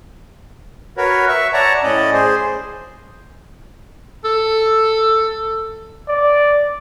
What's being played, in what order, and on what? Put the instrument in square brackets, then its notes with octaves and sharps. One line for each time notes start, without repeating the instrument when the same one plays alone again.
[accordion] F#4 A#4 B4 C#5
E5 C#6
C#5 D5 F#5 A5 A#5
A2 C#4 D5 D#5
G#4 C5
[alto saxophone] A4
[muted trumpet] D5